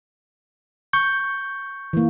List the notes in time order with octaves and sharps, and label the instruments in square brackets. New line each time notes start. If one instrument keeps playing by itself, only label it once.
[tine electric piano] C#6 G6
[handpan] E3 A#3